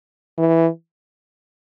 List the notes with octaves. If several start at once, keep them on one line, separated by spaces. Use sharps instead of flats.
E3